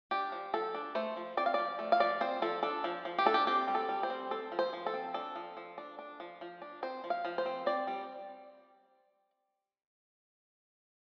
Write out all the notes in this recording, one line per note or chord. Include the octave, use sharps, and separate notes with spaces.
D4 G4
F3
F3 A4
D4
A3 C5
F3
C4 D5
F5
F3 D5
A3
F5
F3 D5
C4 C5
F3 A4
D4 A4
F3
F3
G4
D4 A4
G4
C4 G4
G3
A4
G3
C5
C4
C4 A4
F3
C5
F3
A4
C4
D4 A4
F3
F3
D4
D4
F3
F3
D4
C4 C5
F3
F5
F3
C5
C4
C4 D5
G3